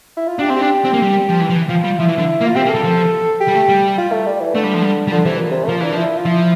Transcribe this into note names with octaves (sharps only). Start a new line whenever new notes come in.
E4
F4
D4 G4
C4
G4
D4
C4
A#3
G3
F3
E3
F3
E3
F3 F4
G3
F3 E4
E3
D3
A#3
F4
C4 G4
A#3
G3 A4
F3
G4
G3
A3
G3
F4
A3
G3
E3
D3 A3
G3
F3
G3
G3
D3 F3
C3 E3
A#2
C3
A3
F3 A#3
E3 D4
F3 E4
F4
F3 E4